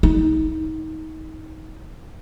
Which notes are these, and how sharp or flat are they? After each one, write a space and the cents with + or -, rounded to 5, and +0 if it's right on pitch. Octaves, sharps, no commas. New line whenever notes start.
D#4 +25